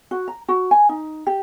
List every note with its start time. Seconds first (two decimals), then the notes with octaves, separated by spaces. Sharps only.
0.11 F#4
0.28 A#5
0.48 F#4
0.71 G#5
0.89 D#4
1.27 G4